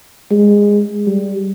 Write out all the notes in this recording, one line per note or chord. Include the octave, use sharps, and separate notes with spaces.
G#3
G3